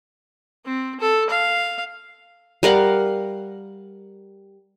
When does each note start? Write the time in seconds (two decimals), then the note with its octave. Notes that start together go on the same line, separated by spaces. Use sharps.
0.66 C4
1.00 A4
1.30 F5
2.63 G3 A#4 F5 F#5